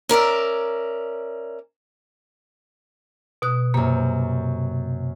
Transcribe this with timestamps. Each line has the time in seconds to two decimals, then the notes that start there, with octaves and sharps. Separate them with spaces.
0.09 C#4 A#4 D5 E5
3.42 B2 D#6 F#6
3.74 F#2 C3 A#3